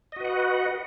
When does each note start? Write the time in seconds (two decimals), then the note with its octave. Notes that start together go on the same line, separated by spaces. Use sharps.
0.12 D#5
0.16 F#4
0.20 B4
0.24 F#5